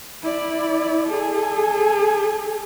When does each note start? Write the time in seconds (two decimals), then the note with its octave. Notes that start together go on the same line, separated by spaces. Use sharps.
0.22 E4 D5
1.07 G#4 A4